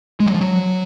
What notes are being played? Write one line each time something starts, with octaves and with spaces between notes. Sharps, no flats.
G#3
F#3
F3
F#3